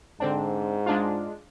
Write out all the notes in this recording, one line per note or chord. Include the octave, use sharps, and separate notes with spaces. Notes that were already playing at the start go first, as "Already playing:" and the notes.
G#2 D3 C4 D4
G#3 D4 F4